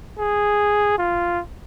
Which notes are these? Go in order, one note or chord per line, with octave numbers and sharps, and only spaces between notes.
G#4
F4